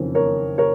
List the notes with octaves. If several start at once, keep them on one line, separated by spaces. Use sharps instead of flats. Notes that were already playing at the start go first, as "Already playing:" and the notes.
Already playing: F#1 F2 D#3 A#3 C#4
A#4 C#5
A#4 C#5